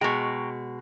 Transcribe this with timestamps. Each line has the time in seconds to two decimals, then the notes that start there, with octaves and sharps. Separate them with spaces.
0.01 B2 G#3 G5 A#5 C#6